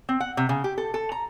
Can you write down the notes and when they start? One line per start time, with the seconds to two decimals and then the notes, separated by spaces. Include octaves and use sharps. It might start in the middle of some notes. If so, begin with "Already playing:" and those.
0.09 C4
0.20 F#5
0.37 C3
0.49 C#3
0.64 G4
0.78 A4
0.94 A4
1.12 A#5